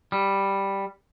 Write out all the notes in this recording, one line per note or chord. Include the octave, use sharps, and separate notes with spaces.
G3